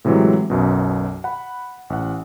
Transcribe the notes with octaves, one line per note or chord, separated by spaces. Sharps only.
A2 C3 E3 F#3 G#3
B1 F#2 B2
F#5 B5
A1 F#5